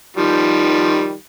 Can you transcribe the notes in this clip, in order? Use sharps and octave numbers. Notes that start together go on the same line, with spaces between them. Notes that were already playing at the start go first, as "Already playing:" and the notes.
D#3 F3 G3